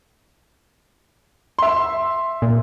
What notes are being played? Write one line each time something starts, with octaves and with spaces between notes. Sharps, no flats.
E5 C6
A#2